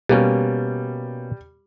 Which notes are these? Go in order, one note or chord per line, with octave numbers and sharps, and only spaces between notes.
B2 G3 A#3 C#4